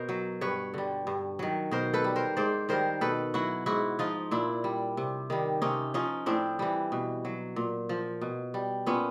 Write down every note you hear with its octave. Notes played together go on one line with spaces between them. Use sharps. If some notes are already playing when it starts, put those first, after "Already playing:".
Already playing: B2 A#4 C5
F#3
G2 B4 C#5
D3 G3
G2
D#3 F#3
B2 A#4 C5
A4 B4
G3
A#4 C5
G#2 C5 D5
D#3 G3 A#4 C5
B2 A4 B4
F#3 E4 F#4
G#2 E4 F#4
F3 D#4 F4
A#2 D4 E4
G3
C3
D#3 G3
C3 C#4 D#4
F3 C#4 D#4
A2 C4 D4
E3 G3
B2
F#3
A#2
F3
B2
G3
A#2 B3 C#4